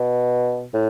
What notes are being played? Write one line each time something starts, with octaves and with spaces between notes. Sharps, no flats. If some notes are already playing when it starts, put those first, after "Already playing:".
Already playing: B2
A2